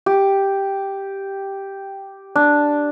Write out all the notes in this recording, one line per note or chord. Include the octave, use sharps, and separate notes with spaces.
G4
D4